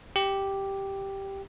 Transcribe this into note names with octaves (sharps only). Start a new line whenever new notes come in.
G4